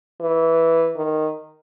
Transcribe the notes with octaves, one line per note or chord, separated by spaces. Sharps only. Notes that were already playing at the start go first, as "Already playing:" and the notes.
E3
D#3